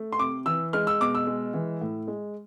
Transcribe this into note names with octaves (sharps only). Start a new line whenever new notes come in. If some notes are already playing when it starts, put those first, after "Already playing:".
Already playing: A3
C6
C3 D6
E3 E6
G#3 F6
E6
B2 D6
E6
G#3
E3
A2
G#3